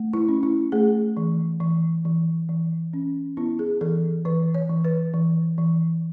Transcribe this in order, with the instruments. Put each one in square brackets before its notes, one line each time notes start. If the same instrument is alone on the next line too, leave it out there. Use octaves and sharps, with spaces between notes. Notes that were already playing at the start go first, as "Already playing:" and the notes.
Already playing: [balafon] A3
E4
C#4
E4
A3 G#4
E3
E3
E3
E3
C#4
B3 E4
G#4
E3 A4
E3 B4
C#5
E3
B4
E3
E3